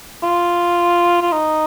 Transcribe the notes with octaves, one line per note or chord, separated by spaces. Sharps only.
F4
F4
D#4